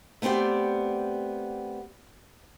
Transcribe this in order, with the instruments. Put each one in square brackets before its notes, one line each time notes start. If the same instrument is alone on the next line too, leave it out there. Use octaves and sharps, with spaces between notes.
[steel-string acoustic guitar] A3 B3 C4 G4 D5